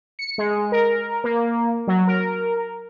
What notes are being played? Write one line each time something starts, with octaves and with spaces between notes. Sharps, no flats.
C#7
G#3
A#4
A#3
F#3
A#4